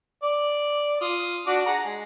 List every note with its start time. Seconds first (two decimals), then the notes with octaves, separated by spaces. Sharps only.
0.23 D5
1.01 F4 D#6
1.47 D4 F#4 D5
1.66 G#4 F#5 A#5
1.85 G#3